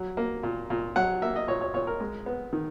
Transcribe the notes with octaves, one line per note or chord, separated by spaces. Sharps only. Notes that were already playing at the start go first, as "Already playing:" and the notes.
Already playing: F#3
A#3
A#2
A#2
F#3 F#5
A#3 E5
D#5
A#2 C#5
C#5
A#2 C#5
A#4
G#3
B3
D#3